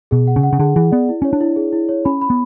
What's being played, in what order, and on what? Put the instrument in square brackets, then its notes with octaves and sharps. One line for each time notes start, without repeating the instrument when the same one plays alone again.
[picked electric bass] B2 [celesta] G#4
[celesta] F#5
[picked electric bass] C#3
[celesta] F#5
[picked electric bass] C#3
[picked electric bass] D3 [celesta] G#4
[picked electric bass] E3 [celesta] G#4
[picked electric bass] B3 [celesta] D5
[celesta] E4
[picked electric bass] C#4 [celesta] C#5
[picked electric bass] D4
[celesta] E4
G#4
E4
C#5
[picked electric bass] C#4 [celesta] B5
[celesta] B5
[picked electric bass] B3